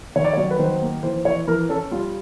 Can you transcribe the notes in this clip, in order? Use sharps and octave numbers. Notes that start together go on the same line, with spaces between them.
D#3 C#5
D5
C#5
F#3
B4
D#3 C5
A#3
E3 C5
E3 C#5
E3 A#4
C#4 A4
G3 F4